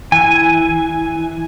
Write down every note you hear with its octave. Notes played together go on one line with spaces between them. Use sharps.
E3 G#5